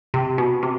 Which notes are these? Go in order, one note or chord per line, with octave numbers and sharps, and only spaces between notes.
C3
B2
C3